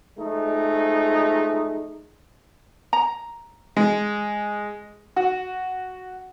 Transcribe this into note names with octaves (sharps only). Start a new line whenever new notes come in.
F3 G#3 A3 D#4
A#5
G#3
F#4